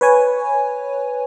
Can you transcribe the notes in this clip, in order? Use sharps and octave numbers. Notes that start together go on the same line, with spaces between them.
B4 C#5 G#5